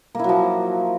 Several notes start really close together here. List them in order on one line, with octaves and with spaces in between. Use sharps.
A#3 E4 F#3 F3